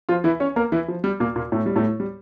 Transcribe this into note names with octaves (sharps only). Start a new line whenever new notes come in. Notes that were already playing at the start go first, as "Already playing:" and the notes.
F3 F4
E3 E4
C#4 C#5
A#3 A#4
E3 E4
F3
G3
A#2 A#3
A#2 A#3
A2 A3
G3
A2 A3
G3